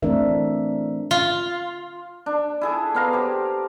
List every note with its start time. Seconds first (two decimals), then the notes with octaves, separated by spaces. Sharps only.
0.02 E3 A3 C4 D4 A#4 E5
1.11 F4
2.26 D4
2.61 E4 G#4 A4
2.95 B3 F5 A#5
3.13 G4 C5